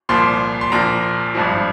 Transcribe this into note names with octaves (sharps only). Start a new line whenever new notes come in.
C2 A#2 F3 C6
C6
A#1 A#2 F3 A#5
G#1 G2 F3